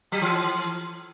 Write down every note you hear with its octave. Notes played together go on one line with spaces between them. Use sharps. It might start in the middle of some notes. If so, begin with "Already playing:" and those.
F#3
E3